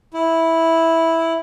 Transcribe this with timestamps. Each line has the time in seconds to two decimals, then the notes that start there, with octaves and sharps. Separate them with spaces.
0.14 E4